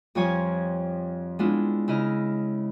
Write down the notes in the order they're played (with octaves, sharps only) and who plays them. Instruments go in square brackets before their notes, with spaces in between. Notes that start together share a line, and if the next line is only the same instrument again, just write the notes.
[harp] F2 F3 G3 C5 C#5 G#5
G#3 B3 D4 E4 F4
C#3 E4 D#5 F6